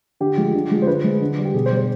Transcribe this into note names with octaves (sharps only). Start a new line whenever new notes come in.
D3 G4
F3 G#3
D3
F3 G#3
C5
D3 B4
G#3
D3
G3
G4
B2 G#4
C5
G3
C5